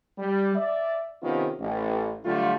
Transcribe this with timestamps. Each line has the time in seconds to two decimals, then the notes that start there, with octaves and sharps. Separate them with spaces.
0.18 G3
0.55 D5 E5
1.22 C3 D#3 B3 C#4 F4
1.60 A1
2.25 D3 F#3 G3 A3 F4